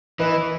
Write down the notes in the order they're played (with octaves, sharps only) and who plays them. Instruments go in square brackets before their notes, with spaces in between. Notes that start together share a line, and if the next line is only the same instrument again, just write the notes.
[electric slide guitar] E3 [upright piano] B4 D#5